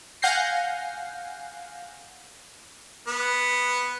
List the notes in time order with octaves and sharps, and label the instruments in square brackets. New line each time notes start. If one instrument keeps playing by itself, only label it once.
[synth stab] F5 F#5 G#5 G6 A#6 C7
[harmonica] B3